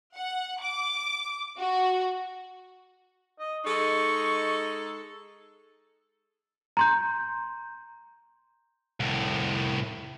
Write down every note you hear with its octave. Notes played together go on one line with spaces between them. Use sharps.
F#5
D6
F#4
D#5
G#3 D#4 A4 C#6
A#5 C6 G6
C2 A2